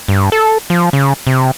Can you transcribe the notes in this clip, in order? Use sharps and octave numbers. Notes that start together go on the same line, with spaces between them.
G2
A4
F3
C#3
C3